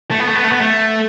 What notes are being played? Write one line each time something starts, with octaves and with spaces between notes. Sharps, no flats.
A3
B3
A3
B3
A3
B3
A3